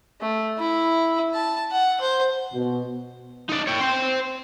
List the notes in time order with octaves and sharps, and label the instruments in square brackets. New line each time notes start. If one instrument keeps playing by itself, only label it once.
[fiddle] A3
E4
A5
F#5
C5
[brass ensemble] B2
[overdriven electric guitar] D#4 D5
C#5 G5
C5 G5